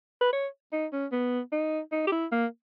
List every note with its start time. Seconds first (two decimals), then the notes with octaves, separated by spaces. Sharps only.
0.21 B4
0.33 C#5
0.72 D#4
0.93 C#4
1.12 B3
1.52 D#4
1.92 D#4
2.07 G4
2.12 E4
2.32 A#3